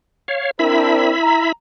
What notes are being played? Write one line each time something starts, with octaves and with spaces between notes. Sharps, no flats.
C#5 F5
C4 D4 E4 A#4 E5 B5
A#5